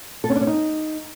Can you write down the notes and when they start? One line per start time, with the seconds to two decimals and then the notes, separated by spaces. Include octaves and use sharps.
0.24 A4
0.30 C#4
0.35 D4
0.41 C#4
0.47 D#4